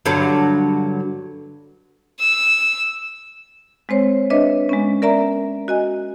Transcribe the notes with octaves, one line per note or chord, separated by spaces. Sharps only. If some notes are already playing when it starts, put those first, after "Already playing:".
G2 D3 F#3
E6
G#3 C4 C5 C#5
D4 B4 C#5 D#5 E5
G#3 B3 C#4
A#4 D5 E5 A#5
F#4 D#5 G#5